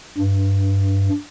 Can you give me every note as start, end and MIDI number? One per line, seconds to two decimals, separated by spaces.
0.18 1.09 43